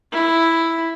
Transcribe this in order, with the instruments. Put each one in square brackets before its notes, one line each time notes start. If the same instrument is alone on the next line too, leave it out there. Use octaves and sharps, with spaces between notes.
[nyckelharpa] E4